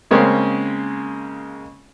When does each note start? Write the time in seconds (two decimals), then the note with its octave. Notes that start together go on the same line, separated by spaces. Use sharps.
0.11 C#3 G#3 A#3 C4 C#4